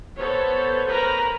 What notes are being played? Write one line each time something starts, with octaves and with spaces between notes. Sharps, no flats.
B3 A4 C5 C#5
A#4 B4 A#5